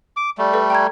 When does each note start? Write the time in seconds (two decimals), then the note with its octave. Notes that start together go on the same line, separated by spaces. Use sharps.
0.17 D6
0.38 G3 A3
0.54 A4 B4 D5
0.70 G5 A#5 G#6